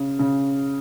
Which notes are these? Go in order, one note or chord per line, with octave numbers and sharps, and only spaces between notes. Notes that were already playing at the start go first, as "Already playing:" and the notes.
Already playing: C#3
C#3